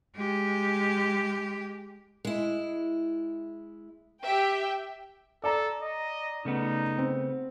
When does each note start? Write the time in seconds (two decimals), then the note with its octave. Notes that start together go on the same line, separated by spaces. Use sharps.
0.16 G#3 G4
2.25 G#3 E4
4.23 G4 E5 G5
5.44 A4 D5 A#5
5.82 D#5
6.45 C#3 A3 B3 D#4
6.98 C4